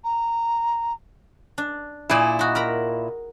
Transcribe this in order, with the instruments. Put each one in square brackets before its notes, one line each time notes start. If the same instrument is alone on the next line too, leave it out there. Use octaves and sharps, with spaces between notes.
[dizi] A#5
[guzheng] D4
[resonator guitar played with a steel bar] A#2 E4 [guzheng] G#4 D5 G#5
[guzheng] D#4 F#4
A#4 A#5 B5